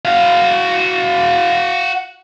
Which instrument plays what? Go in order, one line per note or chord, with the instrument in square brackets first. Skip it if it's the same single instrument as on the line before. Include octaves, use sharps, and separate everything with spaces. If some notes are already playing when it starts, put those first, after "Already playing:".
[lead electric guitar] F#4 F5